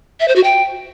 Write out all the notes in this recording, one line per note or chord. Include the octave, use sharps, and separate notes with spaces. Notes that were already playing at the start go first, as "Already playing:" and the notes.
E5
C5
F#4
G5